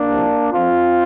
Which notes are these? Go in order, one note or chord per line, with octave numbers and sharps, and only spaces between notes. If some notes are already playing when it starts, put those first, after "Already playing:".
Already playing: A#3 D4
C2 C3 F3
F2 F3 C4 F4